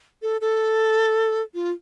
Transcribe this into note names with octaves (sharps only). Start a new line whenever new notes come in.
A4
A4
F4